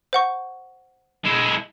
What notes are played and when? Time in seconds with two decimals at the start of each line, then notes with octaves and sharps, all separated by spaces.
0.13 C5 F#5 C#6
1.25 G#3 E4